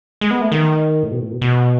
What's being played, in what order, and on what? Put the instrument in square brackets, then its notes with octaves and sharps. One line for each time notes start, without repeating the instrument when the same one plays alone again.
[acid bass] G#3
B3
A3
D#3
A2
B2
A2
B2
B2